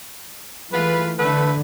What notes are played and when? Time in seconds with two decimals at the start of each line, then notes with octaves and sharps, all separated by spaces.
0.72 E3 A3 F4 G#4 B4
1.19 D3 A3 A4 B4